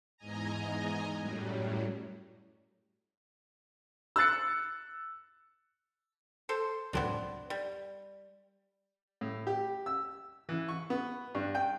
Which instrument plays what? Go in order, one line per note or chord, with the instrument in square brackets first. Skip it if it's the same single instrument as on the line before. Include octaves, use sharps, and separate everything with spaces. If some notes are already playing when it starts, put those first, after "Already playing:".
[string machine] E2 G#2 D#5 G#5 A#5
F#2 A2 F#3 G3
[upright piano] E6 F#6 A6 C#7
[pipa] A4 C5
[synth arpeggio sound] C#2 F#2 A2 [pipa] B3 C4 D4
[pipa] G3
[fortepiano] A2
G4
E6
E3
C#6
B3
G2
G5